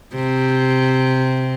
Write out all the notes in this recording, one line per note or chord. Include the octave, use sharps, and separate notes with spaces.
C3